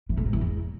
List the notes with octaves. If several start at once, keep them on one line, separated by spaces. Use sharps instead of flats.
E3
A2
G#2
E3
E2